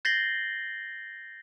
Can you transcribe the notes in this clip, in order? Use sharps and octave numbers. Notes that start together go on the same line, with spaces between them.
G6 A6 A#6 C7 F#7 G7